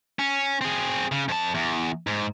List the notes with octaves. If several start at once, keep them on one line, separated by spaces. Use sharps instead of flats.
C#4
C4 G#4
C#3
F2 A5
E2
G#2